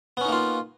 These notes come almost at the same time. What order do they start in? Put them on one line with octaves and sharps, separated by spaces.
B3 C#4 D#4 A#3 F4